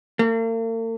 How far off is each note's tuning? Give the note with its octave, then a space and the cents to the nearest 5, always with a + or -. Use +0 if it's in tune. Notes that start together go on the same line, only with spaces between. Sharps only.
A#3 -45